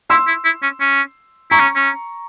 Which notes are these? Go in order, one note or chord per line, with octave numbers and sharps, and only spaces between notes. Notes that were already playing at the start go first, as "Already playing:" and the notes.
E4 C6 E6
E4
E4
C#4
C#4
E4 A#5 C#6
C#4
C#4